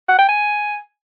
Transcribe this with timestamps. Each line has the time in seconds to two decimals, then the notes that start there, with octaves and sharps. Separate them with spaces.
0.08 F#5
0.18 G5
0.28 G#5